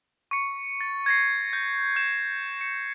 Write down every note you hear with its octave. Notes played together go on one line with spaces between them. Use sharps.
C#6 C#7
A6
G#6 A#6 C7
G6
G6 E7
C#7